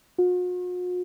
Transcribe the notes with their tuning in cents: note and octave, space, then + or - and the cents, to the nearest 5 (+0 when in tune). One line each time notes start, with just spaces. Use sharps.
F#4 -45